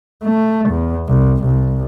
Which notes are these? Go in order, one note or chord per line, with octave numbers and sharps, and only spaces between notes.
A3
E2
C2
C2